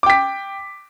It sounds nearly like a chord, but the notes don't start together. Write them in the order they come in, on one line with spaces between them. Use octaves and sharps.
D6 G5 B6